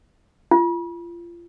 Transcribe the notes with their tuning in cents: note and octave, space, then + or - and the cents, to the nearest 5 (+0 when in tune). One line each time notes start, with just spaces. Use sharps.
F4 -30